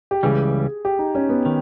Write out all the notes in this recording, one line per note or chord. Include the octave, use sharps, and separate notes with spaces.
G4
C#2 C#3 E3 G3 G#4
G4
D#4
C#4
B3
D#3